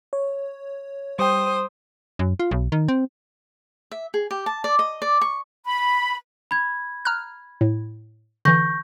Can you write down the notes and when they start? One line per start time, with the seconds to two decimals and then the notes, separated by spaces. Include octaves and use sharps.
0.13 C#5
1.19 G3 C5 G5 D#6
2.19 F#2
2.40 F4
2.51 B1
2.72 D#3
2.88 C4
3.91 E5
4.14 G#4
4.31 G4
4.46 A5
4.64 D5
4.79 D#5
5.02 D5
5.21 C#6
5.65 B5
6.51 B5 G#6
7.05 A#5 F6 F#6
7.61 A2
8.45 D3 E3 C#6 G6 A#6